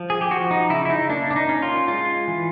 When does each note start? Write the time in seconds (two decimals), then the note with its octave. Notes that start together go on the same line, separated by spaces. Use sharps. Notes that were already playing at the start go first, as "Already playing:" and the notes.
Already playing: F3
0.10 G#4
0.21 G4
0.31 F3 F#4
0.51 D#4
0.70 C#3 E4
0.85 E4
0.90 D#4
1.09 A#3 D4
1.31 D4
1.36 D#4
1.49 C#4
1.62 F4
1.88 G#3 F4
2.28 E3